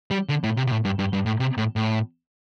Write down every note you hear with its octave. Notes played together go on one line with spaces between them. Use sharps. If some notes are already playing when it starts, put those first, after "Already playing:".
G3
D3
A2
C3
C3
A2
G2
G2
G2
A2
C3
A2
A2